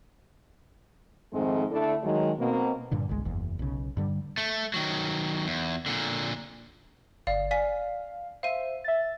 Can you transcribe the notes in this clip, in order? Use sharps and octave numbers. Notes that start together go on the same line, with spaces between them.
F2 G#2 D#3 G#3 A3 C4
D3 A3 D4 E4 A4 D5
D#3 F#3 G#3
B2 A#3 C4
G2 A#2 D3
G1 C2 G#3
F#1 E2
B1 C#3
G2 D3 G3
A3
D#3 F#3
E2
A#2 D3
G1 D5 F5
D5 F5 G#5 B6
C5 E5 F5 D#7
E5 A6